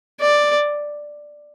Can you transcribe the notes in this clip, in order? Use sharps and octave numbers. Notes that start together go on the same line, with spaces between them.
D5